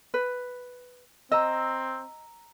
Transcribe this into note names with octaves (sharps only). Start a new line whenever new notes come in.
B4
C4 D#5 A#5 E6